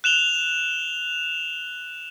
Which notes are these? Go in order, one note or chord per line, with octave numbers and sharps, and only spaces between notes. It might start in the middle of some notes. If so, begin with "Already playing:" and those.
F#6 E7 F7 G7